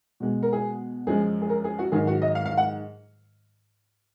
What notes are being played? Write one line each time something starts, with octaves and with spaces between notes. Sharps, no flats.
B2 G#3
A#4
G#4
F#2 F3 G#3 G#4
G#4
A#4
G#4
F#4
G#2 D#3 F#3 G#4
F#4
D#5
F5
F5
F#5